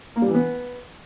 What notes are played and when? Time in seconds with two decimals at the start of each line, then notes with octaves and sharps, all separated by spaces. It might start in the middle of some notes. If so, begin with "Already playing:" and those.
0.16 A#3
0.22 G3
0.28 E3
0.34 B3